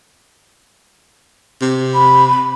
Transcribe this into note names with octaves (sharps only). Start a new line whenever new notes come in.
C3
B5